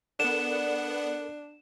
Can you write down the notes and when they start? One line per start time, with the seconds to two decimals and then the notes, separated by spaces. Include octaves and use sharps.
0.20 B3 D4 A4 A#4 D5 F#5 E7